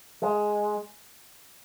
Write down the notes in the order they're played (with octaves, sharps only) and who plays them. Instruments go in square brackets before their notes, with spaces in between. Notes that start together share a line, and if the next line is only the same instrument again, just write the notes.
[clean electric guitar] G#3